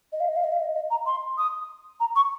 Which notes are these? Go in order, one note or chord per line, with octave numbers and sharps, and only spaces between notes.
D#5
F5
D#5
F5
D#5
F5
D#5
D#5
A#5
C6
D#6
A#5
C#6